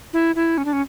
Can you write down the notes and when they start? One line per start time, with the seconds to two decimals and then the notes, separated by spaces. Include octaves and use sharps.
0.13 E4
0.35 E4
0.58 C#4
0.65 D4
0.73 C#4